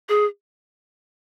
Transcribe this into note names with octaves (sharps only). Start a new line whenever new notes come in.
G#4